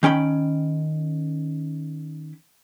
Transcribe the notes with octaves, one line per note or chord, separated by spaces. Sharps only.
D#3 C#4 G5 B5